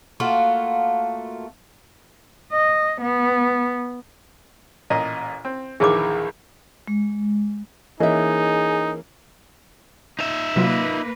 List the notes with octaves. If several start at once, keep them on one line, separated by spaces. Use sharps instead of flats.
A3 A#3 F4 F#4
D#5
B3
A1 A#2 D#5
C4
A#1 D#2 E3 G#4 D6
G#3
E3 A#3 C#4 D#4 G#4 D#5 E5
D#4 E5
C3 F#3 A#3 F4 B4